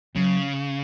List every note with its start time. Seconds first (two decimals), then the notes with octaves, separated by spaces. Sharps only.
0.15 C#3 F#3